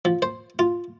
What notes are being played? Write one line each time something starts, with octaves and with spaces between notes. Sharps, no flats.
F3
C5
F4